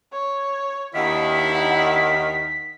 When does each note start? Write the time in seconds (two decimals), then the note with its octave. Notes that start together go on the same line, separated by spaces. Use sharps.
0.12 C#5
0.94 D#2 D#3 D4 E4 F#5 B6